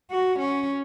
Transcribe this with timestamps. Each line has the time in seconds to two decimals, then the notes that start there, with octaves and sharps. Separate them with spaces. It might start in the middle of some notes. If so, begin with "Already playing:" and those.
0.10 F#4
0.39 C#4